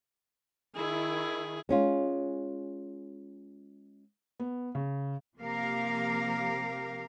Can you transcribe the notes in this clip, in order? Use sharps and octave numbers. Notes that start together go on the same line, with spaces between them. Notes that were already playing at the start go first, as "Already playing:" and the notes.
D#3 E4 G#4
G#3 C#4 F4
B3
C#3
C3 F3 A#3 G4 A#4 F5